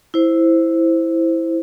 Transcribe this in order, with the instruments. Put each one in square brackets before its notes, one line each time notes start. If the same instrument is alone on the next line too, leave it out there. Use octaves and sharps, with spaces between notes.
[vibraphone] E4 C5